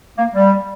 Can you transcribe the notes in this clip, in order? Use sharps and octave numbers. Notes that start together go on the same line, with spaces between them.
A#3
G3